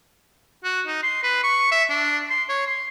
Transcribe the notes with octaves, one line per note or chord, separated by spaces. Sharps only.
F#4
D#4
C6
B4
C#6
E5
D4
C6
C#5
C6